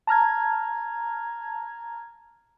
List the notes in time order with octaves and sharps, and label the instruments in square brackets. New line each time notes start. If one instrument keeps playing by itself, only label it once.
[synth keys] A5 A#5 F6 G#6